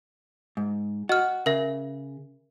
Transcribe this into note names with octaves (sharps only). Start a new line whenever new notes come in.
G#2
F#4 D#5 F6
C#3 A#4 E5